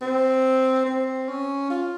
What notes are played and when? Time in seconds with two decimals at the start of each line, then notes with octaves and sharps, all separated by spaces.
0.01 C4
0.86 C4
1.29 C#4
1.70 F4